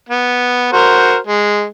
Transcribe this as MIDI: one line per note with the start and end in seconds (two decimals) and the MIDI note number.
0.09 0.70 59
0.73 1.17 66
0.73 1.17 70
0.73 1.17 72
1.27 1.67 56